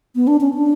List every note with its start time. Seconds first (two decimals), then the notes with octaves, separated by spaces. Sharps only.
0.15 B3
0.27 D4
0.41 C#4
0.54 D4